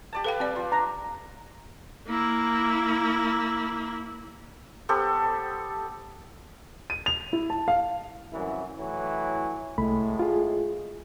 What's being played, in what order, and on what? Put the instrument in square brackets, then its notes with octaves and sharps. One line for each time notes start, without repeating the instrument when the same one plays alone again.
[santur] G4 D5 A5
[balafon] A4 F5 G5 [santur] B4
[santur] G3 [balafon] C4 D5
[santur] F3
[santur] D4 [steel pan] A#5
[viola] A#3 E4
[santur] B3 G4 A4 C5
[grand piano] D#7
F7
E4
A5
F5
[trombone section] C2 F#2 E3
A2 E3 F#3
[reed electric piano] C2 A3 B5 [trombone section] A2 G#3
[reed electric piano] F4 G#4